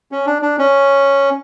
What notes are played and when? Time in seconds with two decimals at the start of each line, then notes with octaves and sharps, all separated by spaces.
0.12 C#4
0.26 D4
0.42 D4
0.59 C#4